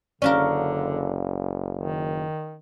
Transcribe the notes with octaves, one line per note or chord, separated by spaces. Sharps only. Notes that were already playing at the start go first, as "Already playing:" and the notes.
F#1 D3 C#4 D4 A#4 D5 F5
D#3